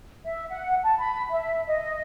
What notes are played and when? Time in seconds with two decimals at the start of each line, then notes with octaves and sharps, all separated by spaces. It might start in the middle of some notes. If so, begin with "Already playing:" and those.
0.24 E5
0.49 F#5
0.84 A5
0.98 B5
1.31 E5
1.67 D#5